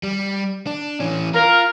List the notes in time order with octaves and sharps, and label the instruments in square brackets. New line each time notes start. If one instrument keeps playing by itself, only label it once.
[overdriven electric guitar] G3
D4
E3 C#4
[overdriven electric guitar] F4 [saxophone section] A#4